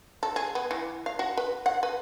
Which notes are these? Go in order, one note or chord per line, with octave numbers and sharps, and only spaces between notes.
A4
G#4
B3
E3
F5
F#4
B4
F#5
B4